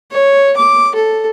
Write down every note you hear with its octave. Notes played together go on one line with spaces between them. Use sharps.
C#5
D6
A4